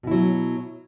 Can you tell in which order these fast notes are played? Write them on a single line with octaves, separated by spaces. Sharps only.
B2 E4 F#3